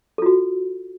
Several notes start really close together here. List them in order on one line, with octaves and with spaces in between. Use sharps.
A4 F4 F#4